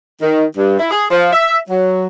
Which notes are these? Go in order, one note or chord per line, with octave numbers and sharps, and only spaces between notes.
D#3
G2
E4
G#4
F3
E5
F#3